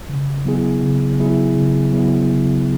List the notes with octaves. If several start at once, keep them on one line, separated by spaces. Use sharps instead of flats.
C#3
F#3 B3 E4 G#4
C#3
F#3 B3 E4 G#4
C#3
F#3 B3 E4 G#4
C#3